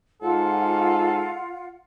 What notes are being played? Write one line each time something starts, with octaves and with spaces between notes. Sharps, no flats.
G#2 F4 A4 F#5